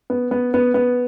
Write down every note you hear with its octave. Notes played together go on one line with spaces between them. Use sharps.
B3
B3
B3
B3